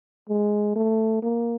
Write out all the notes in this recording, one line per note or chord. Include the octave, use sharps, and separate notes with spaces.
G#3
A3
A#3